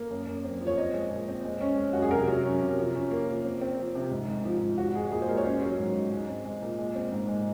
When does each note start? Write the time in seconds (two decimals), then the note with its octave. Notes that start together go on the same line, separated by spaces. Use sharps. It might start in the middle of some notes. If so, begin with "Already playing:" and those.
Already playing: A#3
0.10 F#2
0.27 F#2
0.44 C4
0.61 F3
0.67 C#5
0.77 C4 D#5
0.94 G#3
1.11 A#2
1.28 C4
1.44 G#3
1.61 C#4
1.78 G#3
1.93 F#2 F#4
2.02 G#4
2.11 C3 A#4
2.28 F#3
2.45 C#4
2.62 C3
2.78 F3
2.94 C#4
3.11 A#3
3.28 F3
3.45 C4
3.61 C4
3.78 F3
3.95 C3
4.11 G#2
4.28 G#2
4.45 F3
4.62 G#2
4.78 C4 F#4
4.95 G#3 G#4
5.12 A#2 G#4
5.22 C5
5.28 G#3 A#4
5.37 C#5
5.45 C#4 C5
5.62 F#3
5.79 G#2
5.95 G#2
6.12 G#3
6.29 C4
6.45 G#3
6.62 A#2
6.78 G#3
6.95 C4
7.12 G#2
7.28 G#3